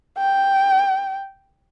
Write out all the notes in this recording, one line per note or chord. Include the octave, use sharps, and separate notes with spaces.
G5